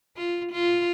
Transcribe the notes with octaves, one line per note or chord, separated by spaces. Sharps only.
F4
F4